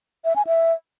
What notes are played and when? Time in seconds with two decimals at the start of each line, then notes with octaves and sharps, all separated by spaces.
0.25 E5
0.36 G#5
0.47 E5